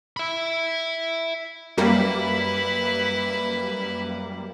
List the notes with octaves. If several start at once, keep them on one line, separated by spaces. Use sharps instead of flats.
E5 B5
F#2 G3 A#3 E4 B4